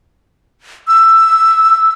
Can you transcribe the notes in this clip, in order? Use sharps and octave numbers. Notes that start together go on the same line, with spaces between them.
E6